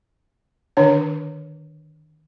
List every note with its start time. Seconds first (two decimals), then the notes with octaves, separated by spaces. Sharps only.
0.77 D3 D#3 D4 C#5